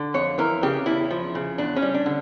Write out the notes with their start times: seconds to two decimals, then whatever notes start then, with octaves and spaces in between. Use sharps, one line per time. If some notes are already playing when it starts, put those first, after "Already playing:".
Already playing: D3
0.14 F2 C#5
0.38 E3 A#4
0.63 C#3 G4
0.86 E2 E4
1.10 F3
1.35 C#3
1.58 E2 D4
1.76 C#4
1.82 G3
1.94 D4
2.06 D3